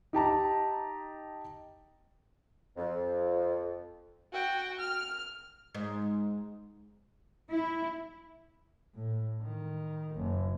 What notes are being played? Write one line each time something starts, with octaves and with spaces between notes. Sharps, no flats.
D#4 G4 A5 A#5
F2
F#4 G5
F6
G#2
E4
A2
D#3
F#1